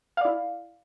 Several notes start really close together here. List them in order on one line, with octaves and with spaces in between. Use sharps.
F5 D5 E4